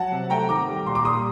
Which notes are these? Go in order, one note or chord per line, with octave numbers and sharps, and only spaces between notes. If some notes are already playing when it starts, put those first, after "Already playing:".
Already playing: F#3 F#5 A5
C3
A3 G5 A#5
D#3 A#5 D6
G3
A#2 C6
D6
G3 C6 D#6